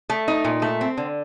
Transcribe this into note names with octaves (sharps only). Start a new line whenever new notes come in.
A3
D#4
A#2
A3
C4
D3